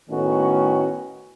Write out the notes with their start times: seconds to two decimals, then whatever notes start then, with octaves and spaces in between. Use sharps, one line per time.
0.10 A2 D#3 A3 B3 C#4 F#4